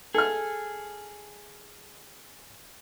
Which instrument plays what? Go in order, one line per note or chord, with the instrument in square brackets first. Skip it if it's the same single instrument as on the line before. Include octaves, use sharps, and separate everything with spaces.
[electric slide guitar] G#4 [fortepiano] A4 F6